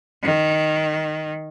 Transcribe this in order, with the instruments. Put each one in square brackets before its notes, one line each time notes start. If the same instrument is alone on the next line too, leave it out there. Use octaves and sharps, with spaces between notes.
[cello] D#3